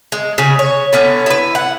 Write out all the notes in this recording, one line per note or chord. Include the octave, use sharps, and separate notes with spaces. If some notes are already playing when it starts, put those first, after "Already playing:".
G#3
C#3 G#4
C#5
D3 B3 C#4
E4 B4
F#5